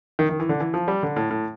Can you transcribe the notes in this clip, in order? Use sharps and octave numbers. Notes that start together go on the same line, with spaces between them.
D#3
D#3
E3
D3
E3
F3
G3
D3
A2
A2